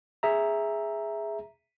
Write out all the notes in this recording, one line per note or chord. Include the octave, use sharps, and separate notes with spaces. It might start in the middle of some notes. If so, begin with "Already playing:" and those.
G#4 E5 A#5